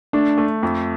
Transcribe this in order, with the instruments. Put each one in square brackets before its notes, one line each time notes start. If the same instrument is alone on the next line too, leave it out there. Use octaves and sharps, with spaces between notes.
[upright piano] A3 [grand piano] D4
[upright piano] A3
F2